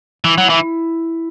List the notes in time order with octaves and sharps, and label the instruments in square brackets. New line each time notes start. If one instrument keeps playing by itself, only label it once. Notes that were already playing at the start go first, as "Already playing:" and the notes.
[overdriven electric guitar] E3 [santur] E4
[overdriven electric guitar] F#3
[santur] E4
[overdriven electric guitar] E3